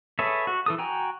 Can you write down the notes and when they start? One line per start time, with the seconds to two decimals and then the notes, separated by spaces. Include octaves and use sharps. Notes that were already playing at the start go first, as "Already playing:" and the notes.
0.19 G#4 A4 B4 C#5 E5
0.47 F#4
0.66 E3 A4 D#6
0.78 F#4 G5 G#5 A#5